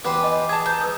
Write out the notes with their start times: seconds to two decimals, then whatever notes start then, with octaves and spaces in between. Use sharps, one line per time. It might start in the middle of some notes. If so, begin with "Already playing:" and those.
0.05 E2 G4 B4 C5
0.20 D#5 G#5 D6
0.49 G#4 A5 G#6
0.66 C5 A#5 G6
0.81 B4 D#6